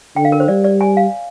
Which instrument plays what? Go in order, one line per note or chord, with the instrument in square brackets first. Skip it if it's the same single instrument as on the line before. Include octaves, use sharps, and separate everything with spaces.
[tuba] D3 [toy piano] G5
[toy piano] F5
A#4
C5
[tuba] G3 [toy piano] D5
[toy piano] D5
G#5
F5